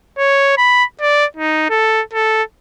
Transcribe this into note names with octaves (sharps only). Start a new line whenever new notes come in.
C#5
B5
D5
D#4
A4
A4